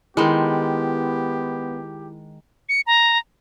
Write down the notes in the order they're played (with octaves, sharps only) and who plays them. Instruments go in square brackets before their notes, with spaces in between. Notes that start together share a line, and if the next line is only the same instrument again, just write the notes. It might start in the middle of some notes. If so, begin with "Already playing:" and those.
[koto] D#3 G#3 [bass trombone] B3 [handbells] E4 B5 C6 [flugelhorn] G4
[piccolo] C#7
A#5